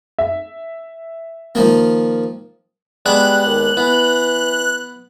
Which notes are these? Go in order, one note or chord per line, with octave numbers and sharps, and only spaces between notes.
E5
D#3 F3 A#3
G3 G#3 B3 D4 F#6
D#2
E3 B3